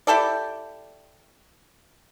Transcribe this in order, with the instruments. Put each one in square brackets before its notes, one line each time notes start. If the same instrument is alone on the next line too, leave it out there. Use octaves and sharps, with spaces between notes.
[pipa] E4 G4 A4 D5